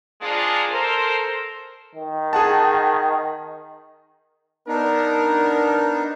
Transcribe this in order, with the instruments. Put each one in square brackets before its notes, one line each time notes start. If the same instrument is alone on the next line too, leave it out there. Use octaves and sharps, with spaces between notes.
[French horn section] F2 G#3 A#3 D4 F4 G#4
A4 A#4 C5
[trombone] D#3
[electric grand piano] G#4 F#5 A5
[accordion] B3 D4 D#4 [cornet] A#4